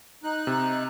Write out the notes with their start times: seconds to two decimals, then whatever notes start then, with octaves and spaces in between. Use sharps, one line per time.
0.24 D#4 F#6
0.47 C3